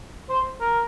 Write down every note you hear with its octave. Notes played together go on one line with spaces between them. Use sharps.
C5
A#4